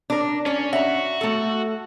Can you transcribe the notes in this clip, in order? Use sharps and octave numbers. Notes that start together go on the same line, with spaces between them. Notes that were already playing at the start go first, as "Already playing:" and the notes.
D4 A#4
C#4 D5
F#4 E5 A#5
A3 A4